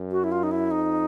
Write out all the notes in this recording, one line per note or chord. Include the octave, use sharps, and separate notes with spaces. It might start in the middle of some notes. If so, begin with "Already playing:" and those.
Already playing: F#2
F#4
E4
F4
D#4
E4
F2 D#4